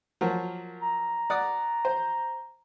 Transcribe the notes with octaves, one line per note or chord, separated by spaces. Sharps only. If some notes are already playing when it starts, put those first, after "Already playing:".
F3 F#3 A#3
A#5
D5 F#5 D#6
C5